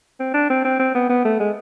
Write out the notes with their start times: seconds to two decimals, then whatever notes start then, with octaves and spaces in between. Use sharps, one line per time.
0.20 C4
0.34 D4
0.50 C4
0.65 C4
0.79 C4
0.95 B3
1.09 B3
1.25 A3
1.40 G#3